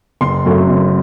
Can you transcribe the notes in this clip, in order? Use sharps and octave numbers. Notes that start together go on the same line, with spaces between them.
F#1 C6
F#2 F#3 A3
F#1